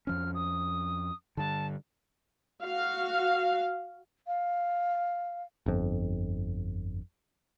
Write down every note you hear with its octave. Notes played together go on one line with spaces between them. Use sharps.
F2 F3 C#4 F6
D#6
G2 D3 A5
F#4 F5
F5
G1 F2